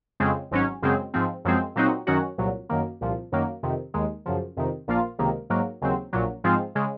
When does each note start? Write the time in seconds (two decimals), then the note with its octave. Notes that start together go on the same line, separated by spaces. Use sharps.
0.20 F2 C#3 G#3 C4
0.51 G#1 G#2 F#3 C#4
0.82 F#2 C#3 G#3 C4
1.14 G#2 F3 C4
1.45 F#2 F3 G#3 C4
1.76 A#2 F#3 C4 D#4 F#4
2.07 F#2 D#3 F#3 C#4 F#4
2.38 C2 A#2 F#3
2.69 F#2 D#3 A#3
3.01 C2 A#2 F3
3.32 F#2 D#3 F#3 A#3
3.63 F2 C3 D#3
3.94 D#2 D#3 G#3
4.26 F#2 C#3 F3
4.57 F2 C3 D#3
4.88 A#1 A#2 F3 A#3 F4
5.19 C#2 C3 D#3 A#3
5.50 G#2 F#3 A#3
5.81 D#2 C#3 F#3 C4
6.13 A#1 A#2 F#3
6.44 G#2 F3 G#3 C4 F4
6.75 C#3 G#3